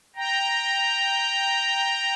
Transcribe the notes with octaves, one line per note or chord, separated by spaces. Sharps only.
G5 A#5